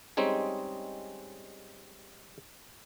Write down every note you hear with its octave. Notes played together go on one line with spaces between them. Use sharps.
G3 G#3 C4 C#4 D#4 G#4